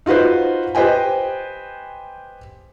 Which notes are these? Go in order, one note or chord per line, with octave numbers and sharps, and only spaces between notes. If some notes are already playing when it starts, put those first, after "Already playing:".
D#4 F4 F#4 B4 C5
G4 B4 C5 D#5 G5 G#5